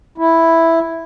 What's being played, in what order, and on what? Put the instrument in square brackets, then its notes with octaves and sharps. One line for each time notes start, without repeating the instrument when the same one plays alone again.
[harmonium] E4